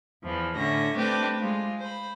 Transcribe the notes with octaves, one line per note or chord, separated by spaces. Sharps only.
E2 E3 F3
A2 D3 C#4 E5 A#6
A3 C4 D4 G4 B4
G#3 F4
C5 B5